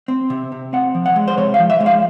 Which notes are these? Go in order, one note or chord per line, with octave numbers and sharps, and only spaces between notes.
C4
C3
C3
C4 F#5
F3
F#5
G#3
C5
C3 C#5
F5
F3
E5
G#3
F5